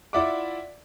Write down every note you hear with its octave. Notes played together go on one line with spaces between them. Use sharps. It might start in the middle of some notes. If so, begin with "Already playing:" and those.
E4 F4 D5 E5 F#5 D6